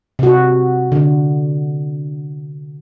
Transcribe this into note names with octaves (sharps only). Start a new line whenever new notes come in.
C3 F#4
D3